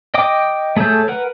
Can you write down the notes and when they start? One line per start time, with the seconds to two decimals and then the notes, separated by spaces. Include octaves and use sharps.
0.14 D#5 G5 D6 D#6
0.76 A3 G#4 A4 C#5 G6
1.08 A#4 B4 F#5